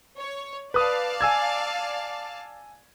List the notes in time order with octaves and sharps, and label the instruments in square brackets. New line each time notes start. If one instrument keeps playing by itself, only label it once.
[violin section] C#5
[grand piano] B4 D#6 [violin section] D5 F5 A5
[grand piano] G#5 E6 G#6